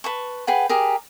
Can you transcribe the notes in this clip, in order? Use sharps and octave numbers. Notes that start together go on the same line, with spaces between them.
B4 A5 C#6
G#4 B4 F#5 G5
G4 G#4 A#4